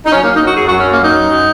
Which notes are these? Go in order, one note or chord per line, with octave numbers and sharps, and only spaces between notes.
D#4
F#3 C#4
A#3
F#2
D#4
F#3 F#4
F#2 G#4
F#4
F#3
C#4
F#2 A#3
F#3 D#4
F#2
F#3